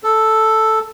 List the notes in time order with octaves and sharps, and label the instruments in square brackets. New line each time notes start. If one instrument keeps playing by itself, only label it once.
[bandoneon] A4